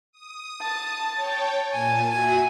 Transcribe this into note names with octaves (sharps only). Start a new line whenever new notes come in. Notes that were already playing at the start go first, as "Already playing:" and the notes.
D#6
A5
C#5 G5
A#2 G#5 A5
F#4 E5 G#5